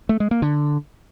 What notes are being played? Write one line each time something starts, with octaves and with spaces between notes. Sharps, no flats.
A3
G#3
A#3
D3